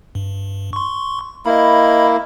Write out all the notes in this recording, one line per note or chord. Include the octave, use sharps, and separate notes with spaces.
G2
C6 C#6
A#3 E4 D#5 B5